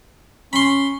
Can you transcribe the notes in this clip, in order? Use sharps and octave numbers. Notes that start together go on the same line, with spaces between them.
C#4 B5 C6